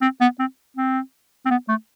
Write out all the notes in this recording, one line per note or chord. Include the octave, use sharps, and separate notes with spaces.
C4
B3
C4
C4
C4
B3
A3